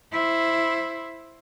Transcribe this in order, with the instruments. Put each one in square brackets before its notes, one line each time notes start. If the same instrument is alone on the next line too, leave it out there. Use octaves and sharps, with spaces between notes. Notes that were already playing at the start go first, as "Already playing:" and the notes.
[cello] E4 C5